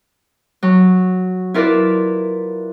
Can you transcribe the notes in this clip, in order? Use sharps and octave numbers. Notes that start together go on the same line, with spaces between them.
F#3
E4 F4 A#4 B4 D5